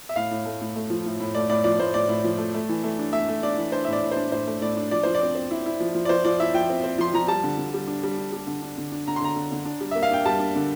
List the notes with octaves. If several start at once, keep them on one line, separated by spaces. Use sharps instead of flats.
E5
A2 F5
A2
A3
A2
A3
F3
A2
A2
A3 D5
A2 D5
F3 D5
A2 C5
A2 D5
A2
F3
A3
A3
E3
A3
D4
A3 E5
A3
D4 D5
E3
D4 C5
E5
A2
D5
A2
C5
D4
A2 C5
A3
A2 D5
D4
F3 D5
F3 C5
D5
C4
C4
E4
E4
F3
F3
D5
F3 C5
F3 D5
E4 E5
F3 G5
C4
C4
F3 C6
F3 A#5
G3 A5
D3
D3
G3
D4
G3
D4
G3
D3
D4
D3
D4
D3 A#5
C6
D3 A#5
D3
D3
D4
G3
A#3 E5
F5
D4 G5
G3 A5
D4
D3